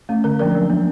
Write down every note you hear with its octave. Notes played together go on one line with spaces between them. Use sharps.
A3 C#4
D3 A#4
F3 A#3 D4 A#4
F#3
B3 D4